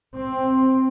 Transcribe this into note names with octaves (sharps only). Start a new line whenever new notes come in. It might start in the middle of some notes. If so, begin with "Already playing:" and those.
C4